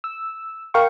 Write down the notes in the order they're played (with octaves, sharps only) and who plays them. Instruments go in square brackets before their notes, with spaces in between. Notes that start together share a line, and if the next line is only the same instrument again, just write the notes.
[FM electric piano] E6
A#4 F5 G5 C#6